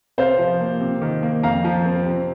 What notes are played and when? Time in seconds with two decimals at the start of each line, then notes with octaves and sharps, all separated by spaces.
0.18 C3 C5 F5
0.39 F3
0.61 A#3
0.80 C3
1.02 D#3
1.23 A#3
1.43 F2 F5 A#5
1.65 F3
1.86 C4
2.06 C3